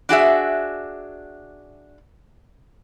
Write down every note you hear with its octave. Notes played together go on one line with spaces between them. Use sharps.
D4 F#4 G#4 E5